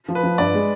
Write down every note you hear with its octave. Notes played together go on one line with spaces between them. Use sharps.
F3
B4
F3
G2 D5
G#3